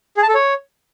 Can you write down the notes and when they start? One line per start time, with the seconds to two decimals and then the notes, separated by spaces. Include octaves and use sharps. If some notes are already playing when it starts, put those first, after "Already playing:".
0.17 G#4
0.23 A5
0.29 A4
0.34 C#5